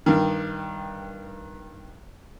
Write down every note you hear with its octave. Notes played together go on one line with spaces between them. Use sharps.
G2 D#3